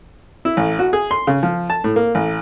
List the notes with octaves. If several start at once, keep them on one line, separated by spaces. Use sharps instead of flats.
E4
A1
F#4
G#4
C6
C#3
F3
A5
A2
A#3
A1